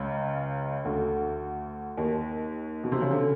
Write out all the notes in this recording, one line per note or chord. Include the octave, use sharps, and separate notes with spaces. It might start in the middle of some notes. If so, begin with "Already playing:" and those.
Already playing: C#2 C#3
D2 D3
D#2 D#3
B2
C3
C#3
D3